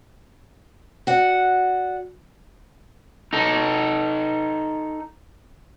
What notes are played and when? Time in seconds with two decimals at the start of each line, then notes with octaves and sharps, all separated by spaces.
1.07 F#4 D5 F#5
3.33 D#4 A4